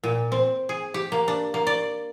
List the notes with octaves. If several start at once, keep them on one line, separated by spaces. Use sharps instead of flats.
A#2
C4
G#4
G4
A#3
D4
A#3
D5